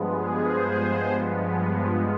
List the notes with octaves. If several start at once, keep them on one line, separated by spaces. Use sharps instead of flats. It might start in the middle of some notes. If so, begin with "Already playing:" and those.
Already playing: G2 F3 G#3 B3
G#4
C5
G2 F3 G#3 B3